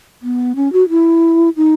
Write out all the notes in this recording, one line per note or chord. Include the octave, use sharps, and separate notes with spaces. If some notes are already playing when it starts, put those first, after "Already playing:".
B3
C#4
F#4
E4
D#4